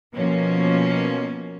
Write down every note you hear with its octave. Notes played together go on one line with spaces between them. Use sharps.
B2 F3 A#3 C#4